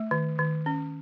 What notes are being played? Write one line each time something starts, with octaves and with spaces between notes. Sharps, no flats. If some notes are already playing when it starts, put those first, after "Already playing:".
Already playing: A3
D#3
D#3
C#4